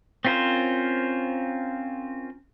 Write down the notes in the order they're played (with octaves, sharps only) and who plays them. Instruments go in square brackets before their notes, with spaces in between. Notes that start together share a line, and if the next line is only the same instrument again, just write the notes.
[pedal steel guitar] C4 C#4 F4 A#4 C5